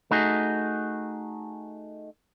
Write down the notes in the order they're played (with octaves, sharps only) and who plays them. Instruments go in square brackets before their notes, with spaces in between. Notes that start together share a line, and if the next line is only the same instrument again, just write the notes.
[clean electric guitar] A3 D#4 F#4 G#4